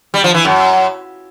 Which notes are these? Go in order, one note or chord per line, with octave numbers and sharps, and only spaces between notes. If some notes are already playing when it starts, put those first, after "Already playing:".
G3
F3
E3
F#2